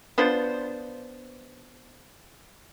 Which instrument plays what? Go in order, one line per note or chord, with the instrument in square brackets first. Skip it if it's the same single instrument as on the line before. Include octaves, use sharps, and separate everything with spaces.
[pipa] B3 D4 F4 C5